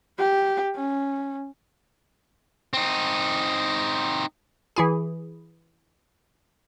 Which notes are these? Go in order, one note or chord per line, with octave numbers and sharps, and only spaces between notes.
G4
C#4
C4 D#4
E3 E4 G#4